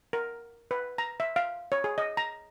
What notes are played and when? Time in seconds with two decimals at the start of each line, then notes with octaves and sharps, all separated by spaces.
0.13 A#4
0.71 B4
0.98 A#5
1.20 E5
1.36 F5
1.72 C#5
1.84 G#4
1.98 D#5
2.17 A#5